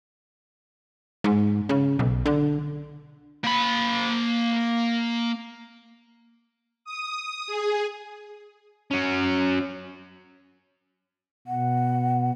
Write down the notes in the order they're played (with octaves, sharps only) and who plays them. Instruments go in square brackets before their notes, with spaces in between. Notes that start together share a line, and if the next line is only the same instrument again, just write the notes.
[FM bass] G#2
C#3
B1
D3
[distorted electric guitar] A#3 B5
[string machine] D#6
G#4
[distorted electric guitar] F#3 C#4
[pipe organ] B2 [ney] F#5